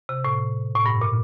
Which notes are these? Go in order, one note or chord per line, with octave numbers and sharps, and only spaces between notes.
C3
A2
A2
G2
A#2